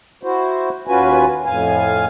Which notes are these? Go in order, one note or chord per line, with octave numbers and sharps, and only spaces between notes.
E4 F#4 C5
D#2 C#4 F4 F#4 B4 G#5
F2 A2 F5 G#5